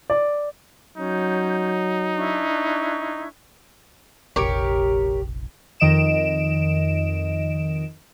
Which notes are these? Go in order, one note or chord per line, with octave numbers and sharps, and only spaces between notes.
D5
F#3 C#4 D#4 G6
D4 E4 C#6
F1 A#1 G4 A#4 C#5
F2 D#3 D#5 D7 E7